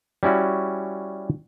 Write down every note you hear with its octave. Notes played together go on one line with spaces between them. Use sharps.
G3 C#4 E4 F#4